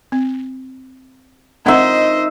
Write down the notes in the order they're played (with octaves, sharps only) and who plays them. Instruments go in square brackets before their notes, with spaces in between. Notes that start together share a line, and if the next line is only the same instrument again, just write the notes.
[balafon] C4
[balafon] C4 F#5 A#5 [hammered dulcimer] D#4 E5 [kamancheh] C5 D#5